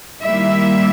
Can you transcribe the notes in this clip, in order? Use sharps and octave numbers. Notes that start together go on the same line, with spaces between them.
D#3 G3 A#3 E4 E5